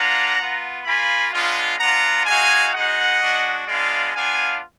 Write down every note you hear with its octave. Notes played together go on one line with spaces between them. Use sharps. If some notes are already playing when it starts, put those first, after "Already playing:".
Already playing: A#3 D4 F4 F#5 A#5
B3 F4
A#3 F4 G#5 B5
G#3 B3 D4 F4
B3 D4 F4 F#5 A#5
G#3 D#4 F#4 F5 G#5
G#3 D#4 F#4 D#5 F#5
G#3 D4 F#4
G#3 B3 D4 F4 D5 F5
B3 D4 F4 F5 G#5